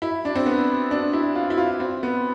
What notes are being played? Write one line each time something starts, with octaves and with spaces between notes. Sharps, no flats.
E4
D4
C4
B3
D4
E4
F4
E4
F4
C4
B3